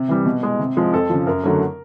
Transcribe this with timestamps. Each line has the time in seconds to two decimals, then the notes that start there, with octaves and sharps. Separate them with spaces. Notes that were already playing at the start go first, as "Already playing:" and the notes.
Already playing: C3
0.08 E3 G3
0.25 B2
0.43 G#3
0.59 C3
0.77 F3 G#3
0.93 F2 A4
1.09 C#3 F3
1.27 F#2 A#4
1.43 D3 F#3 A3